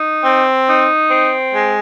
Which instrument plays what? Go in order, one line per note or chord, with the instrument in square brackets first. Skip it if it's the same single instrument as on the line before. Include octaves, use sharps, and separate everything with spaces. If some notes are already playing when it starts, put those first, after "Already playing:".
Already playing: [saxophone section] D#4
C4
D#4
C4
G#3